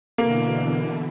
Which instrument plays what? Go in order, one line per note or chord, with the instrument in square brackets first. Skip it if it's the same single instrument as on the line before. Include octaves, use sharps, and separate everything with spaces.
[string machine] B2 D3 E3 [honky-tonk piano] A#3